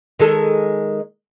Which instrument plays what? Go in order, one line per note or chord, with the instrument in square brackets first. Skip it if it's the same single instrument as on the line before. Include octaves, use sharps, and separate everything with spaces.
[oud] D#3 G#3 A4